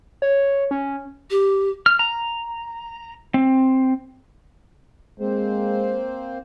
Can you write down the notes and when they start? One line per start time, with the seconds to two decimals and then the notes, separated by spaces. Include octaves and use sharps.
0.22 C#5
0.71 C#4
1.30 G4
1.86 F6
1.99 A#5
3.34 C4
5.20 G#3 A#3 C4 C5